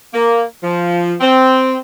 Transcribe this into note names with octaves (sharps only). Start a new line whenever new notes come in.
A#3
F3
C4